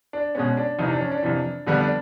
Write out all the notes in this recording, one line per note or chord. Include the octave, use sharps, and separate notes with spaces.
D4
B2 G#3 B3 C#4
D4
F2 C3 E3 D#4
D4
C#4
D4
F2 C3 E3
F2 D3 G3 B3
D4